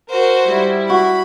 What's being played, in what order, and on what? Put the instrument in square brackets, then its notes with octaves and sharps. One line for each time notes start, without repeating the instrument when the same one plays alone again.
[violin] F#4 C5 [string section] A#4
[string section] G3 E4
[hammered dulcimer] F#4 [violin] B5